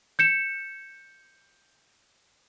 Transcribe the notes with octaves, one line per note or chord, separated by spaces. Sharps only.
G6 C#7 E7